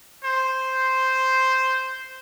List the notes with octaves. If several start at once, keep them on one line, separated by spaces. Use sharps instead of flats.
C5